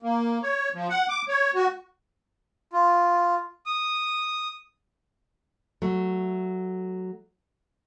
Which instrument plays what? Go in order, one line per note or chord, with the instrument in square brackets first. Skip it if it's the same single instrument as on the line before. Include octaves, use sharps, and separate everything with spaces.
[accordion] A#3
C#5
F3
F#5
D6
C#5
F#4
[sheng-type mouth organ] F4
D#6
[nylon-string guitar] F#3 A3